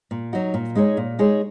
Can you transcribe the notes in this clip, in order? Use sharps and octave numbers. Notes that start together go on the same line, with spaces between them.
A#2
F#3 D#4 F#4
A#2
G#3 D#4 G#4 C#5
A#2
G#3 D#4 G#4 C#5